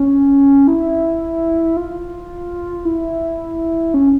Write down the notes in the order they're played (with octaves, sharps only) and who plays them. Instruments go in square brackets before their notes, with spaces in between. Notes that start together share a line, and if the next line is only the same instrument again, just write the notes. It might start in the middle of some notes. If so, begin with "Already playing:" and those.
Already playing: [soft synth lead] C#4
E4
F4
E4
C#4